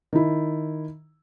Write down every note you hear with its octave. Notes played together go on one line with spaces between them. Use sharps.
D#3 E4